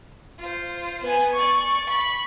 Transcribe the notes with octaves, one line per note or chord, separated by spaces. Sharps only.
F4 C5
B3 G#5
D5 C#6
B5 C#6